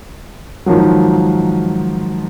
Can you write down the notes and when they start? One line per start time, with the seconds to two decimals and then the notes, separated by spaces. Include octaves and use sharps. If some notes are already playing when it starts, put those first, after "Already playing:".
0.66 G#2 D#3 F3 F#3